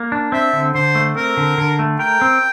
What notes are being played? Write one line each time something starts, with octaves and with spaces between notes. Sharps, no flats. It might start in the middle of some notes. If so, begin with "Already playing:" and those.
Already playing: A#3
D4
C4 E5
D3
D3 C5
A3
C4 A#4
D3
D3
A3
A#4 G5
C4